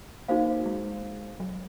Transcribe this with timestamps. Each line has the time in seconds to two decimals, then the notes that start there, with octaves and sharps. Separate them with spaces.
0.28 A#3 D#4 F#4 C5 F5
0.66 G#3
1.40 F#3